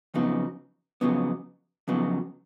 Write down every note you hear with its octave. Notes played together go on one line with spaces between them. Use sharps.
F2 C#3 F#3 B3 D#4
F2 C#3 F#3 B3 D#4
F2 C#3 F#3 B3 D#4